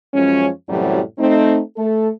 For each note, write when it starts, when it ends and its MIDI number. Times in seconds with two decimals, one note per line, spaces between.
0.14 0.49 42
0.14 0.49 53
0.14 0.49 56
0.14 0.49 61
0.69 1.00 42
0.69 1.00 45
0.69 1.00 48
0.69 1.00 52
0.69 1.00 54
0.69 1.00 55
1.19 1.61 57
1.19 1.61 60
1.19 1.61 63
1.77 2.09 57
1.77 2.09 69